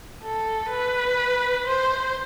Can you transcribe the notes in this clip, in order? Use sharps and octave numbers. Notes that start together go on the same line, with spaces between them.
A4
B4
C5